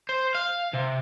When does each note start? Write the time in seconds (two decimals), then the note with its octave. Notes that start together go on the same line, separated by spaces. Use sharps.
0.09 C5
0.35 F5
0.74 C3